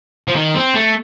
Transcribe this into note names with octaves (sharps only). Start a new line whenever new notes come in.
F3
D#3
C4
A3